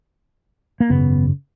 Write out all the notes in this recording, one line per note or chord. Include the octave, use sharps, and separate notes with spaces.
A#3
G#1 F#2 C#3 B3